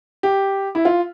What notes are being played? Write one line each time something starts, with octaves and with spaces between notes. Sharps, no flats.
G4
E4
F4